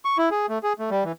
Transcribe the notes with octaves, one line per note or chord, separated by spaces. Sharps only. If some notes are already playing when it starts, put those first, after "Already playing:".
C#6
E4
G#4
A3
G#4
A3
G3
E3